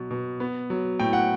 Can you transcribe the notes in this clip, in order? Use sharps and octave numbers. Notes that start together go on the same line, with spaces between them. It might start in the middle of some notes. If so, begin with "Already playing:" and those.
Already playing: B2 F#3 B3
B2
B3
F#3
A2 G5
F#5